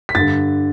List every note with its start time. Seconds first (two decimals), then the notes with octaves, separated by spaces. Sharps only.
0.09 B6
0.15 G2 D3 A6